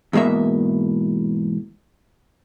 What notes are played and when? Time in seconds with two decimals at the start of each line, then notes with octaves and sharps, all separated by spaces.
0.13 E2 G#2 B2 A#3 E5